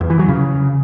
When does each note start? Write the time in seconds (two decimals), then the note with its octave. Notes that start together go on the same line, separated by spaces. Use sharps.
0.01 E2
0.10 E3
0.19 F#3
0.29 C#3